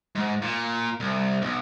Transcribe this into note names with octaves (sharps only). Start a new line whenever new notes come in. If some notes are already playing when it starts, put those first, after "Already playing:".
G#2
A#2
C2
B1